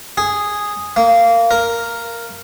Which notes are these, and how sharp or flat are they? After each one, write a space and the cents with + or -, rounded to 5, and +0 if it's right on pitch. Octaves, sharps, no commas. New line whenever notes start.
G#4 -5
A#3 -20
A#4 +0